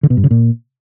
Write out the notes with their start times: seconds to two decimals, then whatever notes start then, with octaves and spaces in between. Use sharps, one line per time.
0.03 D3
0.10 B2
0.17 G2
0.24 C#3
0.31 A#2